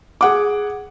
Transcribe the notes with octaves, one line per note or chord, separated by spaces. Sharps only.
G#4 F#5 D6